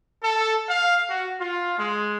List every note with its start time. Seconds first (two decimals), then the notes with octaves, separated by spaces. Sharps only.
0.22 A4
0.68 F5
1.09 F#4
1.40 F4
1.79 G#3